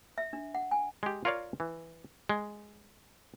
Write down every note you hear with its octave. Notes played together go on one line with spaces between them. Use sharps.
E5
D4
F#5
G#5
G#3 G4
F4 A#4 C#5 D5 F5
E3
G#3